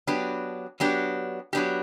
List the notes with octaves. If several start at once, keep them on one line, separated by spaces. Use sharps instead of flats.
F#3 B3 D4 G4
F#3 B3 D4 G4
F#3 B3 D4 G4